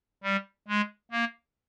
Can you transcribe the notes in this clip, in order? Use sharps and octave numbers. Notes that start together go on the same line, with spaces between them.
G3
G#3
A#3